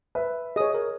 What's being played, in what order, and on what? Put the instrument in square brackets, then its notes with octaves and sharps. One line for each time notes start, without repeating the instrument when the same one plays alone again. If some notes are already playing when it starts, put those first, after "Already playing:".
[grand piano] B4 E5
[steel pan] G#4 C#5 [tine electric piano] D#5 D#6
[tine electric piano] A#4